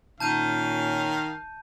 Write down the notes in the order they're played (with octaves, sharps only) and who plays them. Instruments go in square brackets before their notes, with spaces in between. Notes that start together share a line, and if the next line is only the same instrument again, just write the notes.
[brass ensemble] A#2 C#4 [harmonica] D#3 F5 [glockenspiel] A5 G6 D#7